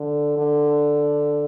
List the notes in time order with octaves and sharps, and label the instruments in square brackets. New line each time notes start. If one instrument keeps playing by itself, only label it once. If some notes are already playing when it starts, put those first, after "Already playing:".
Already playing: [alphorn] D3
D3